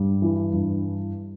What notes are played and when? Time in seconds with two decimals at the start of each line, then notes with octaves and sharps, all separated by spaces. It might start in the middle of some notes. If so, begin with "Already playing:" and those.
Already playing: G2 G3
0.22 E3
0.53 G2